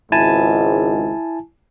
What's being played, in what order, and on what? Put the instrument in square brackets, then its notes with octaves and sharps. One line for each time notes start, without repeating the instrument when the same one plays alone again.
[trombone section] G#1 C#2 G#2 [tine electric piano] E4 G#5 A5